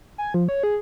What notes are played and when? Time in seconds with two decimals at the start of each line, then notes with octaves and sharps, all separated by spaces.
0.18 G#5
0.34 F3
0.49 C#5
0.63 G#4